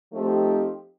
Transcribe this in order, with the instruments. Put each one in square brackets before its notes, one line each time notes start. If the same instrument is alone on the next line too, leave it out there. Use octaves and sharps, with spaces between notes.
[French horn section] F3 A3 C4 D#4 G4